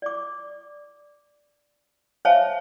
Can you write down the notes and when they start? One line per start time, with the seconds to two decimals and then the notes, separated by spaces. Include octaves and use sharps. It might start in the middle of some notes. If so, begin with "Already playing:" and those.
0.02 D5 D6
2.25 C5 C#5 E5 F5 G#5 A5